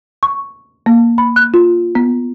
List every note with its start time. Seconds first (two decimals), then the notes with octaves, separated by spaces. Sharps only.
0.23 C#6
0.86 A#3
1.18 B5
1.36 F#6
1.54 F4
1.95 B3